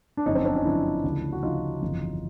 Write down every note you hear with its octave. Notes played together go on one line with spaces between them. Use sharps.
D4
G1 F#2 D3 F3 C#4 D#4
C4 D4
C4 D4
C#4 D#4
G1 F#2 D3 F3 D4 E4
D2 C#3 F3
F#4
D2 C#3 F3 D#4 F4
G1 F2 C#3 E3